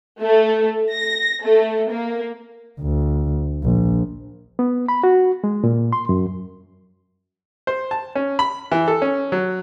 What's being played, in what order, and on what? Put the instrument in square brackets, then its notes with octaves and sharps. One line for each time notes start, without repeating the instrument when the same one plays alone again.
[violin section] A3
A#6
A3
A#3
[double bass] D2
A#1
[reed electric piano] B3
B5
F#4
G#3
A#2
C6
F#2
[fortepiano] C5
A5
C#4
B5
E3
A4
C#4
F#3